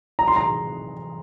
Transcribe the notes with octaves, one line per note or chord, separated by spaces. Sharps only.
A#5
C6
A#5